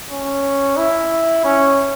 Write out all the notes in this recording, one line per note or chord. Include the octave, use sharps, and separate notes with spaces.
C#4
E4
C#4